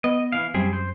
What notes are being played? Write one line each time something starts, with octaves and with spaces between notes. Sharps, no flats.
B3 D#5
E3 F5
F#2 G3 C4 G#4
C5